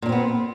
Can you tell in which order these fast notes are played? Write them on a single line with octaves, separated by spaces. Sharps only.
A#2 D4 C4 B3